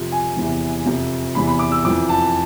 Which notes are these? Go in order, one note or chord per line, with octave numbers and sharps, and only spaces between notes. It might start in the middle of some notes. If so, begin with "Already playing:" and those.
Already playing: F2 C3 F3
G#5
E2 C3 E3
F2 C3 F3
E2 C3 E3 B5
B5
D6
E6
F2 E3 D6
A5